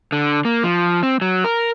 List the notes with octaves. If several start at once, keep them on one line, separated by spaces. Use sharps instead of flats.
D3
A#3
F3
C4
F#3
A#4